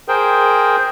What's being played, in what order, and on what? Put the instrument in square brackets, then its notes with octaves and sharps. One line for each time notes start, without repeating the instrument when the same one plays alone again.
[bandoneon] G#4 A#4 C5 G5